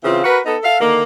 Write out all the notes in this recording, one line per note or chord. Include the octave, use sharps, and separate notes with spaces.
C#3 E3 C4 F4
F#4 A#4 B4
B3 D#4 A4
A4 E5 F5
D3 D#3 A#3